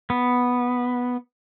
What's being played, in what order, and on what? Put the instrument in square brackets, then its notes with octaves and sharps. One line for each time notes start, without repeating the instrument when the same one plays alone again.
[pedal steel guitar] B3